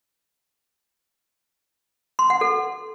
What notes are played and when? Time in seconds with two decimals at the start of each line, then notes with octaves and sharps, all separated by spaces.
2.19 C6
2.30 F#5
2.41 A4